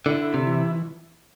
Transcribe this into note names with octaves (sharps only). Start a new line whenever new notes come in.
D3 E4
C3
E3